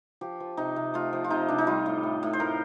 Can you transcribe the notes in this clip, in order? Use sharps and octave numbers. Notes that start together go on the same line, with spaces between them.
F3 G4
F3
C3 D#4
C3
A3 F4
F3
F4
C3 D#4
C3 D4
D#4
G3 F4
A2
A2
A2
C5
A2 A#4